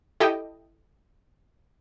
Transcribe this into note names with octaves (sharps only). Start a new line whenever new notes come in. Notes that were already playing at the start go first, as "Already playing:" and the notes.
E4 G4 A4 D#5 G5